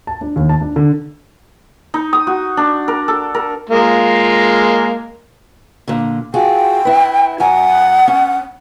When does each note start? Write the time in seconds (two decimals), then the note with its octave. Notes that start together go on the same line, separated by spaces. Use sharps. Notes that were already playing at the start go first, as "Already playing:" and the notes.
0.07 A5
0.21 D4
0.36 D#2
0.49 A5
0.61 D4
0.76 D3
1.94 D#4
2.13 D#6
2.27 F#4
2.57 D4
2.88 A#4
3.08 A4
3.35 A#4
3.70 G#3 A#3 F4
5.88 A#2 D3
6.34 F4 F#4 G#4 G5
6.85 E4 B4
7.40 F#2 F#5 G#5 A#5
8.08 C#4